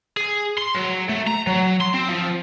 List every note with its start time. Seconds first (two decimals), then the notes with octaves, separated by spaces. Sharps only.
0.17 G#4
0.58 C6
0.75 F#3
1.09 A3
1.27 A#5
1.47 F#3
1.81 C6
1.94 C4
2.09 F3